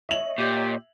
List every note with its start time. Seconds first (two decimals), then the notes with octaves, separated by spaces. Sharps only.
0.09 C#5 D#5 E5 F#7
0.38 A#2 G4